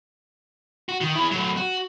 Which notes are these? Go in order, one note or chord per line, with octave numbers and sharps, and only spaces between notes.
F#4
D#3
E4 G#4
F#3 A3
F#4